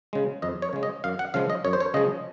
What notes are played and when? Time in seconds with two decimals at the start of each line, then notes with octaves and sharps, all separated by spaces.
0.13 C#3 G#3
0.42 F2 D#5
0.62 C#5
0.73 C#3 G#3
0.83 D#5
1.04 F#2 F5
1.19 F#5
1.34 C#3 F3 G#3 F5
1.50 D#5
1.65 F#2 C#5
1.73 C5
1.80 C#5
1.94 C#3 F3 G#3 D#5